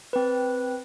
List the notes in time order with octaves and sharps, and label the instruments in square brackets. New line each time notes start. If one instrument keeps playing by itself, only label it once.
[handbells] C4 B4